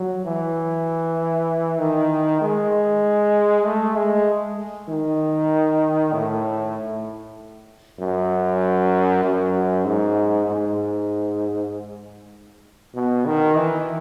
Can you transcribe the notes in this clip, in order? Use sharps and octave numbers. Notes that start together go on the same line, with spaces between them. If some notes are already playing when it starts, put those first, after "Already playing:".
Already playing: F#3
E3
D#3
G#3
A3
G#3
D#3
A2
F#2
F#2
G#2
G#2
B2
D#3
E3